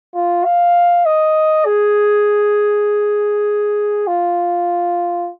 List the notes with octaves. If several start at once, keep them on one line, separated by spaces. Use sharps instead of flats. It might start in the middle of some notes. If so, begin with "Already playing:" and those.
F4
F5
D#5
G#4
F4